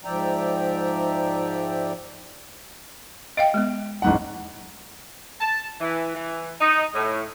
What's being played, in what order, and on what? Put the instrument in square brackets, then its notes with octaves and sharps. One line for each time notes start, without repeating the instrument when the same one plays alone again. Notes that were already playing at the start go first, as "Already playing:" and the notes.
[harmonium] G#2 F3 D5 E5 G5 A#5
[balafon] D#5 F5 G5 [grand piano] D7
[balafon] G#3 B3
[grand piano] A1 G#2 F#5
[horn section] A5
E3
E3
D#4
A2